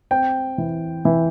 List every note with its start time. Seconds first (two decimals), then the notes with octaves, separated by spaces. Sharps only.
0.11 C4 G5
0.58 E3
1.05 E3